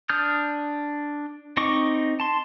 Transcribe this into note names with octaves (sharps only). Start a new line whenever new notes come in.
D4 D#6 F6 G6
C4 D#4 D#5 C#6 D6
A5 C6